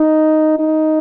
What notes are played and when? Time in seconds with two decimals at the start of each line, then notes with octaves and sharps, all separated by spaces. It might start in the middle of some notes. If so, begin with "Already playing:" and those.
Already playing: D#4
0.59 D#4